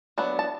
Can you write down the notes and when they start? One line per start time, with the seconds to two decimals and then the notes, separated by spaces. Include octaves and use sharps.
0.18 F#3 B3 D4
0.39 A5